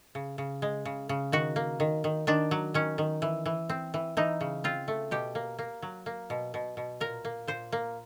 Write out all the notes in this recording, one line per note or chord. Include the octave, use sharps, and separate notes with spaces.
C#3
C#3
G#3
C#3
C#3
D#3 F#4
A#3
D#3
D#3
D#3 D4
F#3
D#3 C#4
D#3
E3
E3
C4
E3
E3 D#4
C#3
C4 F4
A3
B2 G4
A#3
A#3
F#3
A#3
B2
B2
B2
A#2 A#4
A#3
A#2 C5
A#3